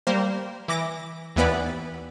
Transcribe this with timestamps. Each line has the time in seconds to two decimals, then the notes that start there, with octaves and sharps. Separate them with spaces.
0.07 G3 A#3 C5
0.68 E3 D6 A#6
1.36 D#2 E3 B3 B4 D5